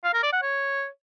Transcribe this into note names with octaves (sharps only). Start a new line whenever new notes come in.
F5
A#4
D5
F#5
C#5